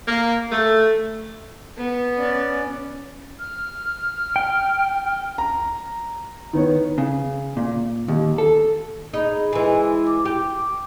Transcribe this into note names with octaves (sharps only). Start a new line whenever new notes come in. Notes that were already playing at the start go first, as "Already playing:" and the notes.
A#3
A3
B3
C#4 D5
F6
G5
A#5
D#3 B3 C#5
C#3
A#2
D#2
A4
D#4 G#4 B5
E3 G#3
D6
G4